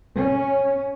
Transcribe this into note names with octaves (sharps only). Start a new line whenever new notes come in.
C#4